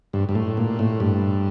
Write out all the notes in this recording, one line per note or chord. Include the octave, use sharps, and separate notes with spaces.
G2
G2
A2
A#2
A2
G2